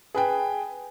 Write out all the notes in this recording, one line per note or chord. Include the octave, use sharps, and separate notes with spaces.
G#4 B4 G5